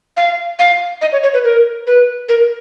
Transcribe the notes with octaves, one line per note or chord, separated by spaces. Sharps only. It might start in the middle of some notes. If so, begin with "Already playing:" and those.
F5
F5
D#5
C#5
C#5
B4
A#4
B4
A#4